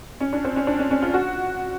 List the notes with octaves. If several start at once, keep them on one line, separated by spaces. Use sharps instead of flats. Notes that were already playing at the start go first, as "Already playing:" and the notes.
C#4
D4
C4
C#4
D4
C#4
C#4
F4
F#4